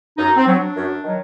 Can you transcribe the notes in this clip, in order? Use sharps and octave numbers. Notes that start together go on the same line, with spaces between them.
F#2 D#4
C4
F#3
D4
F#2
D#3 F#3